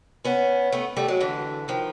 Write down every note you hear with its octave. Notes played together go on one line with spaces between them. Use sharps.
B3 C#4
A3 B3
G3 A3
F#3 G#3
D3 E3
D#3 F3